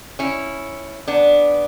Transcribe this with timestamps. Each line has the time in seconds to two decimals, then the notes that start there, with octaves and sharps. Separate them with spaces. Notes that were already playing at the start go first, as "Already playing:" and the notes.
0.19 C#4 E4
1.08 B3 D4